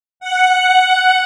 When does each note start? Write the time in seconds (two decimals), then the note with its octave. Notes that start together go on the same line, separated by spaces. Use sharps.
0.20 F#5